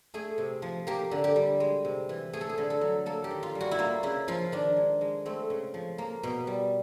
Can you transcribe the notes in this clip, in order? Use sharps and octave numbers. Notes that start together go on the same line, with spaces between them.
A3 G#4
C3
F3
A#3 G4
D3
G4
G3
G#3
C3
E3
A3 G#4
A4
G#4
D3
A4
F#3
A#3 A4
G4
D#3
F4
G3
F#4
E4
A#3 F4
C#3 E4
F3 F4
D#3 D4
G#3
G#3
A3 C4
C#3
F3
A#3
B2
G3